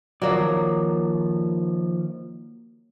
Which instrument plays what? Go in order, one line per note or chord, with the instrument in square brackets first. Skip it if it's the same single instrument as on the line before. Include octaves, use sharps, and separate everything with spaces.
[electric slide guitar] D#3 F3 D5 [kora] F#3 A#3